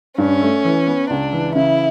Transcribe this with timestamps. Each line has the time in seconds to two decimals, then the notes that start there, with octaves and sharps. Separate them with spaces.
0.18 G2 C#4
0.41 A3
0.65 E3
0.87 B3
1.10 C#2 D4
1.33 E3
1.55 C#3 E4